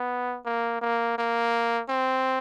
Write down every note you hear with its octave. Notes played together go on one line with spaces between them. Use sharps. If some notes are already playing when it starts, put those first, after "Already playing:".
Already playing: B3
A#3
A#3
A#3
C4